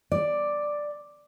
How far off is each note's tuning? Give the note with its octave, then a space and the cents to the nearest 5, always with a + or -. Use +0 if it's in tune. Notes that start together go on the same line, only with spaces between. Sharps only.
D5 +5